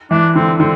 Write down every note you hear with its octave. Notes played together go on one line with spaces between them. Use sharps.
E3 D4
D3 C4
D3 C4